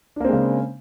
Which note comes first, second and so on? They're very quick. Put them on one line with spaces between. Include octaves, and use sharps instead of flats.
D4 A#3 C4 G#3 C#3